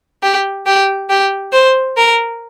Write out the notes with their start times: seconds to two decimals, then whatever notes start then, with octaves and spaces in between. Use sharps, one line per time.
0.23 G4
0.66 G4
1.10 G4
1.52 C5
1.97 A#4